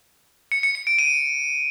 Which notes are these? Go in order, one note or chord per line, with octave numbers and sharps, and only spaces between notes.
C#7
C#7
C#7
D7
D#7